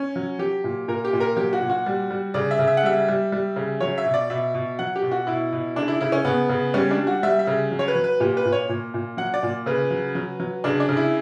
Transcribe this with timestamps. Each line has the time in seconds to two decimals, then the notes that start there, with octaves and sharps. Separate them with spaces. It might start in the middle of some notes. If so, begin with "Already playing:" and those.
Already playing: C#4
0.16 F#3
0.39 F#3 G4
0.64 A#2
0.88 A#2 A#4
1.05 G4
1.13 A#2
1.20 A#4
1.37 F#3 G4
1.53 F#4
1.62 A#2
1.69 F#4
1.86 G3
2.10 G3
2.34 C#3 D5
2.51 E5
2.59 C#3
2.67 E5
2.77 F#5
2.83 G3 E5
3.08 G3
3.32 G3
3.56 C#3
3.80 F#3 C#5
3.98 E5
4.06 B2
4.14 D5
4.30 B2 E5
4.54 B2
4.79 F#3 F#5
4.96 G4
5.02 B2
5.11 F#4
5.27 B2 E4
5.52 B2
5.76 C#3 D4
5.88 E4
6.00 C#3 E4
6.12 C#4
6.25 C#3 B3
6.49 C#3
6.74 G3 C#4
6.91 D4
6.98 G3
7.07 F#4
7.23 G3 E5
7.39 E5
7.47 C#3
7.71 F#3
7.79 C#5
7.88 B4
7.96 F#3
8.04 B4
8.20 A#2 G4
8.37 B4
8.45 A#2
8.52 C#5
8.69 A#2
8.94 A#2
9.17 F#3 F#5
9.34 D5
9.43 A#2
9.66 C#3 B4
9.91 F#3
10.15 F#3
10.40 F#3
10.64 C#3 D4
10.80 D4
10.89 C#3
10.97 E4